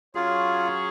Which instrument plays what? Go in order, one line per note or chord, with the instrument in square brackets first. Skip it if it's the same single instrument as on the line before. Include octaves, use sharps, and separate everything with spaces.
[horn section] F#3 C#4 G#4 C#5 [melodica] F4